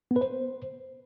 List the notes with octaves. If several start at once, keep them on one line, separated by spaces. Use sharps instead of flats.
B3
B4
C5